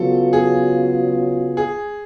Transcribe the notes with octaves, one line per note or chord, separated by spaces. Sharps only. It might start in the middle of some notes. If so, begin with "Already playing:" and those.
Already playing: C#3 F#3 B3 F4 A4
G#4
G#4